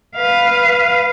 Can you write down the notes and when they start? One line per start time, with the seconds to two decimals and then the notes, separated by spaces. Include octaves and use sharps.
0.16 B4 F5